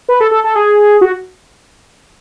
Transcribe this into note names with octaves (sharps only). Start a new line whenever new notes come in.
B4
A4
A4
A4
G#4
F#4